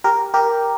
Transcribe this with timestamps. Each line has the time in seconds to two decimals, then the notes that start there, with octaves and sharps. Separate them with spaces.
0.04 G4 A#4
0.34 G4 A#4